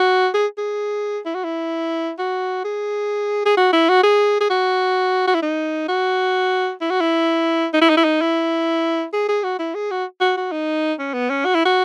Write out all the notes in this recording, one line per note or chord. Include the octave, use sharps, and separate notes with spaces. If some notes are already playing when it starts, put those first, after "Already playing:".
Already playing: F#4
G#4
G#4
E4
F#4
E4
F#4
G#4
G#4
F#4
E4
F#4
G#4
G#4
F#4
F#4
E4
D#4
F#4
E4
F#4
E4
D#4
E4
D#4
E4
D#4
E4
G#4
G#4
F#4
E4
G#4
F#4
F#4
F#4
D#4
C#4
B3
C#4
F#4
E4
F#4